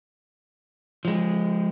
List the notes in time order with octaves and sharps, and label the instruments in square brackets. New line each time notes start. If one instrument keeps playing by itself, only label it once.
[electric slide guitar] F3 G#3